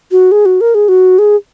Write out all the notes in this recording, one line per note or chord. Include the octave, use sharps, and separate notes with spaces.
F#4
G#4
F#4
A#4
G#4
F#4
G#4